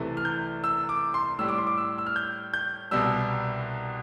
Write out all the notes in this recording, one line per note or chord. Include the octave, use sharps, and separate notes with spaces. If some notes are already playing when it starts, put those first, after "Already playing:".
Already playing: C2 C3 E3 A3
F6
G6
E6
D6
C6
A2 G3 E6
D6
C6
D6
E6
E6
F6
G6
G6
C2 B2 G3 E6